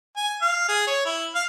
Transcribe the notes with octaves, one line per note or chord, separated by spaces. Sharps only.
G#5
F5
G#4
C#5
E4
F5